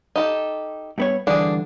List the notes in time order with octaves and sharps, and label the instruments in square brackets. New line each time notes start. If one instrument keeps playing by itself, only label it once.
[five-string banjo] D#4 G4 A4
[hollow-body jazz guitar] G2 B3 C#5
[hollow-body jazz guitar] G2 D3 E3 [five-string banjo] D4 G#4